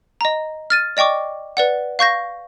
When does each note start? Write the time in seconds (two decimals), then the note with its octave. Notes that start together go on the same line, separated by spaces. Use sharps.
0.21 D#5 A#5
0.70 F6 A6 D#7
0.97 D5 D#5 G5 C#6 D6
1.57 B4 D5 F#5
1.99 F5 C#6 G6 A#6